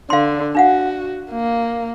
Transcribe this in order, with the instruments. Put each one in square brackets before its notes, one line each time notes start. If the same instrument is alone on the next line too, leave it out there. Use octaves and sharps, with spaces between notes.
[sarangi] D3 [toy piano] F5 C6
[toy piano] D4 F5 F#5 [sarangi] F#4
[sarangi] A#3